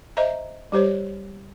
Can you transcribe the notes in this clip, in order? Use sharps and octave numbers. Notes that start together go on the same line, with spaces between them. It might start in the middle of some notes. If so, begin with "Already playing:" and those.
C5 D#5 E5 A#5
G3 G4 C5 C#5